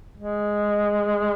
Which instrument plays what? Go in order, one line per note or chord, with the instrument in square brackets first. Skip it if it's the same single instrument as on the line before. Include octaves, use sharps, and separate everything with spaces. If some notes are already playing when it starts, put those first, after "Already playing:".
[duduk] G#3